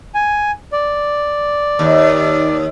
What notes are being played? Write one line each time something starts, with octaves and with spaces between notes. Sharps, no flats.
G#5
D5
D#2